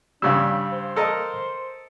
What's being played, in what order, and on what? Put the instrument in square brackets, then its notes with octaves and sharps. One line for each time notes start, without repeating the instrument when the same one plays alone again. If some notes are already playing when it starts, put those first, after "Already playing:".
[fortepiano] G2 C#3 G3 [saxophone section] C#4 D4 [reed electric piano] F5 E6
[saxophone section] C5
[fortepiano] A4 A#4 D#5